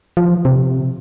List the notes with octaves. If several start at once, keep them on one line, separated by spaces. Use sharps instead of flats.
F3
C3